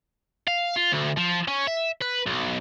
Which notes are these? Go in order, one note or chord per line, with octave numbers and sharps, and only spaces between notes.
F5
F4
D2
F3
C#4
E5
B4
B1